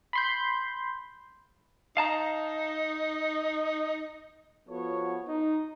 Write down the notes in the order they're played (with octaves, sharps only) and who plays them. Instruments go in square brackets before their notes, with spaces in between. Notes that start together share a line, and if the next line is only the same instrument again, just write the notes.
[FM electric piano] B5 C6 G6
[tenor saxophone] D#4 [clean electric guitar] F5 A5 A#5
[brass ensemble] F3 B3 F4 F#4 A4 C#5
D#4